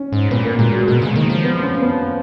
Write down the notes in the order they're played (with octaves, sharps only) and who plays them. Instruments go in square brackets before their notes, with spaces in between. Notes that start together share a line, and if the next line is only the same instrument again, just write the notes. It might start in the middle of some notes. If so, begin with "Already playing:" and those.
Already playing: [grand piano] C#4
[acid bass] G#2
[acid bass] A#2 [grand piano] B3
[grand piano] A#3
[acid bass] A#2 [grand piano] G#3
[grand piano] F#3
[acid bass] B2 [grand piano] G#3
[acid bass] C#3
[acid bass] D#3 [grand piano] A#3
[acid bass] F3
[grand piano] B3
C#4
B3